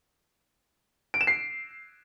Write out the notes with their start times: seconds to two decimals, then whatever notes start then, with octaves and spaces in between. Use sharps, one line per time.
1.14 D7
1.21 E7
1.27 C7